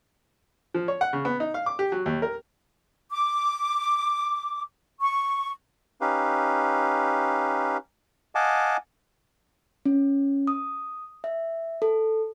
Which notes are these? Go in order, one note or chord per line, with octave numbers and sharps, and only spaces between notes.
F3
C#5
F#5
C#3
B3
D#4
F5
D6
G4
F#3
D#2
A#4
D6
C#6
C#4 D#4 G4 B4 F5
D#5 F5 F#5 G#5 A5 D6
C#4
D#6
E5
A4